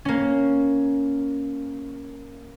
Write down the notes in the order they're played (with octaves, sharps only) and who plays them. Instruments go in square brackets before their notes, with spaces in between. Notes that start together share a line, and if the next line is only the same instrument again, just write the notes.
[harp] A#3 C#4